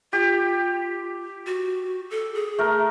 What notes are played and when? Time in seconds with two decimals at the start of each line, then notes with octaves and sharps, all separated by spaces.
0.13 F4 G4
1.47 F#4
2.11 A4
2.34 G#4
2.58 A3 A#4